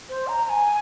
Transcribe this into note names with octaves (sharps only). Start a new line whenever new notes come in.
C5
A#5
A#5
G#5